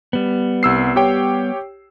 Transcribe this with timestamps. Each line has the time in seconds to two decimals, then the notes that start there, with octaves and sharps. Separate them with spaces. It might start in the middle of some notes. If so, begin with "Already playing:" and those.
0.13 G3 B3
0.63 C2 E6 C7
0.96 G4 C#5 G5